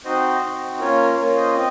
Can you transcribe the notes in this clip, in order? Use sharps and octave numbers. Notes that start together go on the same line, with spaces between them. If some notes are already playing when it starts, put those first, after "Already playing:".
C4 D#4 F#4 C5 D#5
C4 D#4 F#4
A#3 C#4 F4 A#4 C#5
A#3 C#4 F4 A#4 C#5
C5 D#5
C4 D#5